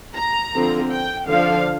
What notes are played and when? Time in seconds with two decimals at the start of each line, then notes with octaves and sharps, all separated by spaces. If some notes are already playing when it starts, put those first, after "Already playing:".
0.16 A#5
0.54 D3 F3 C4
0.92 G5
1.29 D3 F3 D4 F5